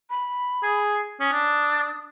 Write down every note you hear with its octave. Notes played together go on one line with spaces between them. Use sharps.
B5
G#4
C#4 D#6
D4